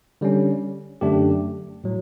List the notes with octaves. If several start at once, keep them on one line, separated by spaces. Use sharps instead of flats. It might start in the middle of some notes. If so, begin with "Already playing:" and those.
D3 G3 C#4
F#2 D3 A3 D4 G4
A2 F#3